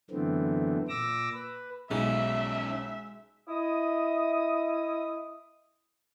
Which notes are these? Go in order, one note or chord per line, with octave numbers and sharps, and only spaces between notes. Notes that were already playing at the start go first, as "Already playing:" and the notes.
F#2 D3 E3 A3 B3 C4
A#2 D6 E6 A#6
B4
B1 G#3 C#4 D#4 E5
E4 D#5 D#6